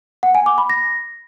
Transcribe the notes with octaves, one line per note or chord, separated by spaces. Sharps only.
F#5
G#5
D6
B5
A#6